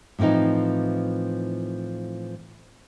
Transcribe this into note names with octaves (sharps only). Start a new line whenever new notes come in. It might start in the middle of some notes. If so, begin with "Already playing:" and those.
A2 E3 F3 C4 D#4